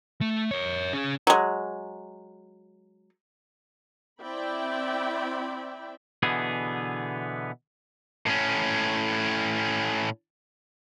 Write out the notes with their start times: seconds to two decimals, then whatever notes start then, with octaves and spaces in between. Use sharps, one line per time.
0.21 A3
0.51 A#4 C#5
0.93 C#4 G#4
1.27 F#3 G#3
4.22 C4 E4 D5 E5 G5 B5
6.23 B2 D3 E3 B3 G#4
8.26 A2 C#4